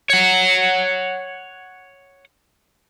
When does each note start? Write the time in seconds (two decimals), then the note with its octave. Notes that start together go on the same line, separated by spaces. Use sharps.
0.10 C#5 F#5